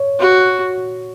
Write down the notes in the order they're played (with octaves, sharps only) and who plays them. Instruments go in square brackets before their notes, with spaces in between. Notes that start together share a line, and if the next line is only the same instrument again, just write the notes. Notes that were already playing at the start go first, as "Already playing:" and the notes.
Already playing: [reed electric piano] C#5
[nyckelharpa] F#4